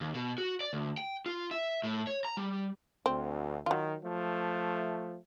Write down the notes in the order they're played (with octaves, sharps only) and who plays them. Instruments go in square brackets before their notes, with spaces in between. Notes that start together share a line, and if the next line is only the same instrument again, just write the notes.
[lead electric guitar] D#2
B2
F#4
D5
D2
G5
F4
E5
A2
C#5
A#5
G3
[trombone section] D2 [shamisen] C4
[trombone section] D#3 [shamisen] F#3 F4
[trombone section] F3 A3